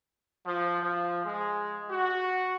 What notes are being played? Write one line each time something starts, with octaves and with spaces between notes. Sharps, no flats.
F3
F3
G#3
F#4